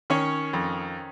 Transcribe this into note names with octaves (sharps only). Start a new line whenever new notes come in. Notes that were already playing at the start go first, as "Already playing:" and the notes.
D#3 C#4 C#5
F2